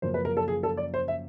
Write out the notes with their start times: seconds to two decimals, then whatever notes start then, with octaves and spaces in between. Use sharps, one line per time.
0.02 F#2 C#3 F3 A#3 C5
0.14 B4
0.25 A#4
0.37 A4
0.48 G#4
0.63 A4
0.77 D5
0.94 C5
1.08 E5